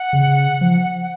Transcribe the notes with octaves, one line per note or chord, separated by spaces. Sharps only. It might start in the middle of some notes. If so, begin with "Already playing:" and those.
Already playing: F#5
C#3
F3